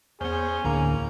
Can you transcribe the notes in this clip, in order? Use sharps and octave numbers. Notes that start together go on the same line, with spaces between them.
E2 B3 C#4 G#4 C5 G6
D2 A2 D3 A#3 A#5